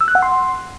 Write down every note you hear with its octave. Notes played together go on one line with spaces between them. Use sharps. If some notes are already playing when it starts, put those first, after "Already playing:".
E6
F#6
F#5
C6